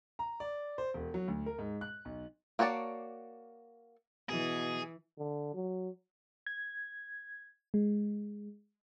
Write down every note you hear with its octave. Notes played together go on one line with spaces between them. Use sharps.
A#5
D5
C5
E1
F#3
D2
A#4
G#2
F#6
B1
A#3 F#4 C#5 D5 A5
B2 E3 G#4
D3
F#3
G#6
G#3